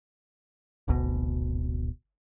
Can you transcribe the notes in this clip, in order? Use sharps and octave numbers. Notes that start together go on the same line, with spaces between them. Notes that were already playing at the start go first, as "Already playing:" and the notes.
D1 G#1 D2 B2